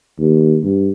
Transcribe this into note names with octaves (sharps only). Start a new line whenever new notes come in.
D#2
G2